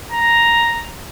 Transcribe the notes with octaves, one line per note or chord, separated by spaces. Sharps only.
A#5